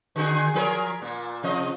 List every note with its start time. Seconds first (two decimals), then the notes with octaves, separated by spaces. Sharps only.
0.16 D3 F#4 G#4
0.54 F3 G#4 A#4
1.02 A#2 A#3
1.43 C3 F3 D#5